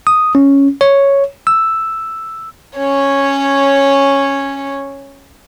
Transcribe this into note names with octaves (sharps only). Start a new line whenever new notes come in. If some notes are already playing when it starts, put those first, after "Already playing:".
D#6
C#4
C#5
E6
C#4 C#5